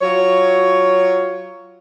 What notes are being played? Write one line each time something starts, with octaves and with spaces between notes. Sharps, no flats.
F#3 F4 C#5